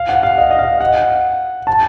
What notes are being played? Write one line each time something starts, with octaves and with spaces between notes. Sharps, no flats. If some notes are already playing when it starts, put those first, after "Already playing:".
Already playing: F5
F#5
F5
D#5
D#5
F5
F#5
A5